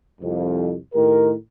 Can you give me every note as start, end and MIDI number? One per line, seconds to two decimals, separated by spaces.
0.22 0.74 36
0.22 0.74 41
0.94 1.31 45
0.94 1.31 51
0.94 1.31 67
0.94 1.31 70